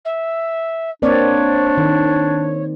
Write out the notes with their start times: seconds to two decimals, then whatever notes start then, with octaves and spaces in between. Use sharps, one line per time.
0.05 E5
1.02 A#3 C4 D4 C#5 D5
1.77 D#3